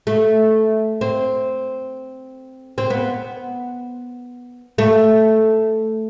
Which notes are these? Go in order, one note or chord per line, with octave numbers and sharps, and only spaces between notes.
A3
C4
C4
B3
A3